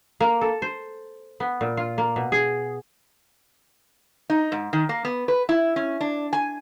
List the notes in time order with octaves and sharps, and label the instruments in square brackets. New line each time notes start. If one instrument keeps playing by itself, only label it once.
[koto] A#3
A4
C5
B3
A#2
F4
A#3
B2
G#4
[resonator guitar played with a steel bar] D#4
G#2
D#3
A#3
B3
B4
E4
C#4
D4
G#5